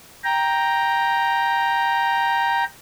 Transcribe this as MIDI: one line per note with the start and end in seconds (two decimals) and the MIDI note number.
0.24 2.64 79
0.24 2.64 82